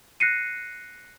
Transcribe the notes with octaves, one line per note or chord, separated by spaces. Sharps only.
F#6 A#6 C7 C#7 D#7